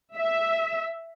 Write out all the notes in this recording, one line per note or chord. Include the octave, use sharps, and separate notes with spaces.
E5